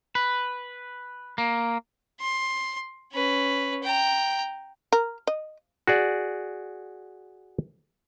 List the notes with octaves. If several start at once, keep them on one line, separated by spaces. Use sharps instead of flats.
B4
A#3
C6
C#4 B4
G5 A#5
A#4
D#5
F#4 G#4 D5